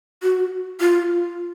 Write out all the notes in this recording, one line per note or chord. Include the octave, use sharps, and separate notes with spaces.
F#4
F4